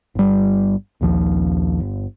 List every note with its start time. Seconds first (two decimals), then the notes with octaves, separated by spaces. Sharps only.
0.15 G1 G3
1.01 A#1 D#2 F3
1.80 G1